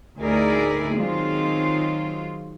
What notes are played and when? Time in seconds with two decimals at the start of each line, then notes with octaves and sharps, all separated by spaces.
0.19 D2 D#4 E4 G#4 A#4 D5
0.95 D#3 F#3 G#3 C4 F4